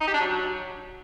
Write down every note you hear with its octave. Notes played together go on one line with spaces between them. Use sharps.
D#4
G4
D4
F#3